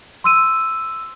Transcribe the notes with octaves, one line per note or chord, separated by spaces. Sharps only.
C6 E6 D#7